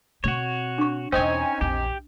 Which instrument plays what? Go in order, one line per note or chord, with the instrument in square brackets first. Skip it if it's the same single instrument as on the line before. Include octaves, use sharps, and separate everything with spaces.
[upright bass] B2 C4 [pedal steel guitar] F#4 C#5
[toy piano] D4 C#6
[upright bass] E2 B2 [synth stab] C4 D#4 G#5 [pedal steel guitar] C#4 C#5
[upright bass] A#1 E2 [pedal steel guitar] G4